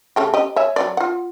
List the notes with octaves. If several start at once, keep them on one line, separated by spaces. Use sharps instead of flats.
C#3 A3 G4
G4 D#5
C#5 E5 G#5
F#3 B3 D5
F4 F#5